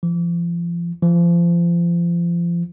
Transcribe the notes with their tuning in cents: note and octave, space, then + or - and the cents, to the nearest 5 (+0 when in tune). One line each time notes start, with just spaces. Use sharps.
F3 -35
F3 -30